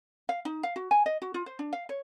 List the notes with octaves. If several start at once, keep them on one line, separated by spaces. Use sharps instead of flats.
F5
D#4
F5
F#4
G#5
D#5
F#4
F4
C5
D4
F5
C#5